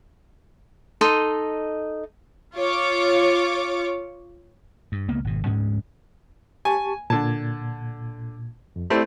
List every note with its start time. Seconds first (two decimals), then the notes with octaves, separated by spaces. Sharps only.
1.01 D#4 A4 D#5 C6
2.55 F4 C#5 D6
4.92 G2
5.08 C#2 A#3 B3
5.24 G#1 B2
5.46 D2 G#2 G#3 C#4
6.65 G4 G#5 A5 C#6
7.10 A#2 D3 A5 G#6
8.76 F2
8.90 A3 C4 E4 G4 D5